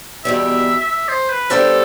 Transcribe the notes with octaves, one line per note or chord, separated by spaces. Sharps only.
E2 B2 G3 E5
E5
C5
B4
G3 B3 D4 G4 A4 C5